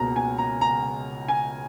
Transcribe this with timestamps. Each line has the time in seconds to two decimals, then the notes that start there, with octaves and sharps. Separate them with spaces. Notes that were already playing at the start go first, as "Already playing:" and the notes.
Already playing: C#2 B2 A#3 A#5
0.16 G#5
0.38 A#5
0.61 A#5
1.28 G#5